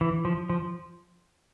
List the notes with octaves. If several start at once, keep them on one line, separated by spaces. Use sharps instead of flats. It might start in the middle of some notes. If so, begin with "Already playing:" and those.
E3
F3
F3